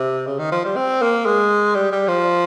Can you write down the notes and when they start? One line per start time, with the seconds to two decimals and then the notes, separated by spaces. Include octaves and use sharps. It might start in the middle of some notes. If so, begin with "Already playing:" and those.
Already playing: C3
0.27 C#3
0.39 D#3
0.52 F3
0.65 G3
0.76 C4
1.02 A#3
1.26 G#3
1.75 G3
1.92 G3
2.08 F3